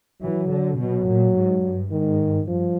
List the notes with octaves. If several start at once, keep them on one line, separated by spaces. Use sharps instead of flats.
E3 F#3
D3
B2 F#3
A#2
G#2
G2
G#2 D#3
G2 F3